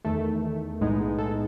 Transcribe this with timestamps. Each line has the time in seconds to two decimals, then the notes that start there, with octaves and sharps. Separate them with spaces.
0.04 E2 D#3 A3 A4
0.80 B1 A2 G#3 B3 D#4
1.18 A4